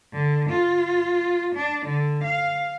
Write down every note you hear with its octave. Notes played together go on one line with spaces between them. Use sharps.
D3
F4
D4
D3
F5